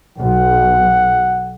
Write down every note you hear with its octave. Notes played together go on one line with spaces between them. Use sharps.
B1 F#5